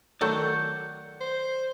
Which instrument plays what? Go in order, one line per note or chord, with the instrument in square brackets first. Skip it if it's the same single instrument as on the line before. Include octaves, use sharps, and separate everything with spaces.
[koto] D#3 F#3 A3 [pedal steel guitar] D5 F#5 G6
[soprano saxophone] C5